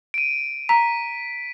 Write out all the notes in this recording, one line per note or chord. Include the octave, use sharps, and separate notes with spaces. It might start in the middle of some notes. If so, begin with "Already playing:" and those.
D7 D#7
A#5 B6